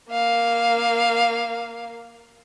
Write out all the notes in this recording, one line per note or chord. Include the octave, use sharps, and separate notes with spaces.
A#3 F5